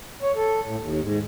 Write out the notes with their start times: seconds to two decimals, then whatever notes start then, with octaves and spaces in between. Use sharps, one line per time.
0.22 C#5
0.36 A4
0.64 A2
0.78 D#2
1.01 G#2